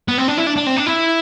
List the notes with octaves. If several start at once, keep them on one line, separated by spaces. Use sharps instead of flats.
B3
C4
D4
E4
D4
D4
C4
D4
E4